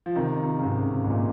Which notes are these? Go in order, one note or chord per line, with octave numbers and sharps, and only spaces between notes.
F3
C3 D#3
C#3
G#2 C3
G#2
A#2